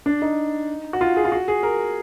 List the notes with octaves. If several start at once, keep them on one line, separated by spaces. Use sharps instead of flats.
D4
D#4
F#4
F4
G#4
F4
F#4
G#4
A#4